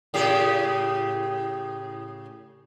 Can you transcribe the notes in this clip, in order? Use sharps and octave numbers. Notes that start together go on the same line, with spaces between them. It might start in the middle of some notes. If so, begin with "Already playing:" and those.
A2 C#3 G4